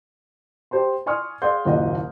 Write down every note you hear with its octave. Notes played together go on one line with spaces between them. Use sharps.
G4 C5 A5 C6
D5 G#5 C6 C#6 D#6 F6
G#4 D5 F5 F#5 C6 G6
F#1 D#2 A#2 E4 D#5 F#5